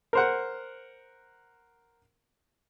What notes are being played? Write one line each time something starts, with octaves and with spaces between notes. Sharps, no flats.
A#4 C5 F#5